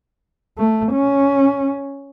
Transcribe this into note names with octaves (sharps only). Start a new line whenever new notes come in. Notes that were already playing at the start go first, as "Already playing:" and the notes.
A3
C#4